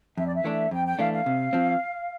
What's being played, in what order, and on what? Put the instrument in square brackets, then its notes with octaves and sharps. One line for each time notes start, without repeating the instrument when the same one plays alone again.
[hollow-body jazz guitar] F2 [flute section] E5
[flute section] D5
E5
[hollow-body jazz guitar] E3 A3 D4
[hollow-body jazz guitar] F2 [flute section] G5
[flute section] G5
[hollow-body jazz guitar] E3 A3 D4 [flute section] F5
[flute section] F5
[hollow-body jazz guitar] C3
F3 C4